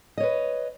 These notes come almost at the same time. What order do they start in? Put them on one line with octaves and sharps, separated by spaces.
D#5 C#5 B4